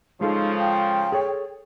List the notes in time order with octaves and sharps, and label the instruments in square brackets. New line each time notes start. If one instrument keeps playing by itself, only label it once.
[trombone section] C#3 F3 [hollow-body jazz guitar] G#3 G#4 A4 [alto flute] D#4
[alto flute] G5
[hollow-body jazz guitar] G#4 A4 C#5